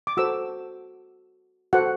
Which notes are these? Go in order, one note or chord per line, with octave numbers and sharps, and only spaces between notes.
D6
F#4 A4 C5 E6
F#4 A4 C5 F#5